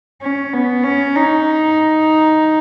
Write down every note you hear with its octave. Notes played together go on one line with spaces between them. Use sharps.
C#4
B3
C#4
D#4